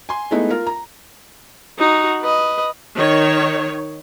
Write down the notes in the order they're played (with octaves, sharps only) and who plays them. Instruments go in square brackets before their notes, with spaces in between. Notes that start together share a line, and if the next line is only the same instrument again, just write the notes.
[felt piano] G#5 C6
G#3 A3 B3 D#4 E4
F4 A#4
A#5
[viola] D#4 F#4
B4 D#5
[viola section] D#3 C#5